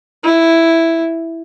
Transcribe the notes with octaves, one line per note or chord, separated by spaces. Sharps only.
E4